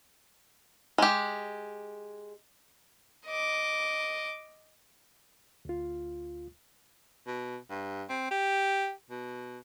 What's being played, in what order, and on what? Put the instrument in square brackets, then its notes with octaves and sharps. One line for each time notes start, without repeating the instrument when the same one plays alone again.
[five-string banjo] G#3 G4
[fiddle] D#5 D6
[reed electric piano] D2 F4
[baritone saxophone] B2
G2
C4
G4
B2